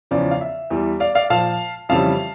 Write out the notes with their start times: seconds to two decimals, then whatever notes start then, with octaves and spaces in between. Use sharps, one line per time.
0.11 E2 C#3 F3 D5
0.31 F5
0.41 E5
0.70 E2 E3 G3
1.00 D5 F5
1.15 D5 F5
1.30 A#2 F3 F5 A5
1.89 F2 C#3 E3 G3 F5 A5